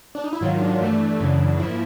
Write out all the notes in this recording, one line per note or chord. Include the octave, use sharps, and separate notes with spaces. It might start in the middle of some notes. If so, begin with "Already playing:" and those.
D4
D#4
E4
G#2 D#3 F#3 F4
D4
G2 E3 A3
F#2 C#3 E3
G#2 F3 A#3 E4